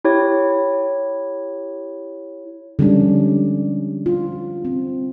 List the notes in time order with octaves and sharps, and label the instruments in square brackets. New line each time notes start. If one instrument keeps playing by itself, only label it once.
[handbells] E4 G4 C#5
[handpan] D3 F3 G3 G#3 C#4 D4
F4
C4